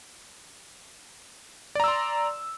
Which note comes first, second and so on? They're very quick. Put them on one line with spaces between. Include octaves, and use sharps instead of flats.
D5 A#5 E6 C6